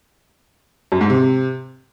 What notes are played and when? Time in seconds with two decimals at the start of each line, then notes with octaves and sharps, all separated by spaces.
0.92 F#2
1.01 G#2
1.10 C3